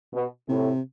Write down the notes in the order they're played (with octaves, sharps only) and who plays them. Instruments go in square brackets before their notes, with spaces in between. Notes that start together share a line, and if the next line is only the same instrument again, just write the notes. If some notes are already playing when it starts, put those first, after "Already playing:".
[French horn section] B2
[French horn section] A2 [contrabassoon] C3